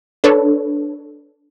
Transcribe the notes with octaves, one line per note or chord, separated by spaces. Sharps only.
D4 A4 B4 C#5